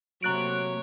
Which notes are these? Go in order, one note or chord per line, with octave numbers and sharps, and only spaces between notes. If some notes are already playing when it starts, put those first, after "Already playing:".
C3 F#3 A3 A#3 C#5 A#5 F#6 D7